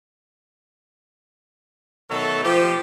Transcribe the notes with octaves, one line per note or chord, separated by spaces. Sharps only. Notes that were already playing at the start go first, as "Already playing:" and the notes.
B2 D#3 F#3 A3 A4
F3 G4